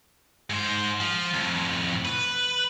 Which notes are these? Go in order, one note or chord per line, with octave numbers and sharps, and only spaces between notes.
G#2 C5
F3
F2 A2
B4